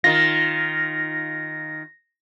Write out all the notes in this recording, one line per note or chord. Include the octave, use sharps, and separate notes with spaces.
D#3 F4 A#6